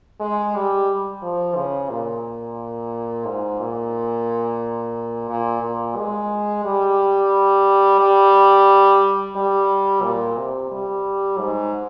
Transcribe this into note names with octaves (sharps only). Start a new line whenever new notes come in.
G#3
G3
F3
C#3
A#2
G#2
A#2
A#2
A#2
G#3
G3
G3
G3
A#2
C3
G3
G#2